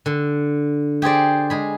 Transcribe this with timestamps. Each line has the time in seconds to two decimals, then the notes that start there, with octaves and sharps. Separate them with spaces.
0.06 D3
1.02 G4 G#4 C5 D5
1.50 G#3 G#4 B5